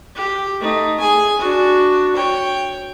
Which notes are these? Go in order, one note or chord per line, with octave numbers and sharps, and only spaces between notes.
G4
A3 D#4
G#4 G#5
D4 F#4
C#5 G5